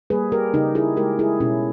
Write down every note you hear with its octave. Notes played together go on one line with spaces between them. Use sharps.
G3 A#3 G#4 B4
G4 A#4
C#3 D#4 G4
E4 G#4
G#3 G4 A#4
E4 G#4
B2 C#4 E4